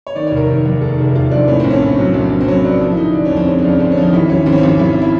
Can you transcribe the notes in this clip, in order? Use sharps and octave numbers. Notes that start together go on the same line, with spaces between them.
C#5
D#3 D5
C#5
F1
A#4
D#3
D#2
G#3 A4
F1
F1 F4
D#2 D4
A2 C#4
C4
A#1
C#4
A2
F#3
A#1
A#1
C4
F#3 C#4
F#3 D4
F3
E4
D3 D#4
D3 D4
C#4
F2
C4
G#3 C#4
D4
F2 C#4
D3 C4
C#4
F3 D#4
G#1 E4
G#1 C#4
G#1 C4
C#4
C4
G#1
G#1 E4
E4